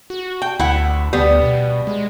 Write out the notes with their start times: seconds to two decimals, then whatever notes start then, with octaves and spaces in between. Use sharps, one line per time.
0.10 F#4
0.42 G5
0.59 D2 E4 F#5
1.13 D2 G3 B3
1.42 B2
1.87 G#3